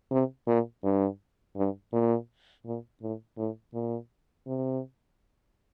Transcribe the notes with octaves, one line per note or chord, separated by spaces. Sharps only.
C3
A#2
G2
G2
A#2
A#2
A2
A2
A#2
C3